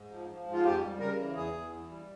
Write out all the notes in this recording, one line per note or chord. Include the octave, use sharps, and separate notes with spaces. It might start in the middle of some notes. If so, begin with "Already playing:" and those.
Already playing: G#2
F3
F3
G#2
F4
F2 G4
G3
C#3 A#4
E3
E2 G#4
E2
E3
G3